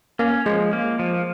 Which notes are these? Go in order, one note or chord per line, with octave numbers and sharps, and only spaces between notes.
A#3 C#4
F3 G#3
A#3
F3